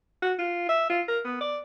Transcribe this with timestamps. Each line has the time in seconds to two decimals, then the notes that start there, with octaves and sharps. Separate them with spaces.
0.22 F#4
0.39 F4
0.69 E5
0.90 F4
1.08 A#4
1.24 B3
1.41 D5